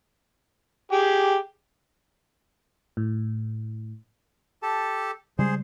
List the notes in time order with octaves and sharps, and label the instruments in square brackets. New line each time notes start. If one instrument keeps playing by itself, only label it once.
[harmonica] G4 G#4
[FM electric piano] A2
[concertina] G4 A4 A5
[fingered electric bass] C#3 G3 G#3 [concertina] G#4 C5